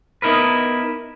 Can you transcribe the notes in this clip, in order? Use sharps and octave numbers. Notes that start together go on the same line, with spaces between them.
B3 D#4 E4 A#4 B4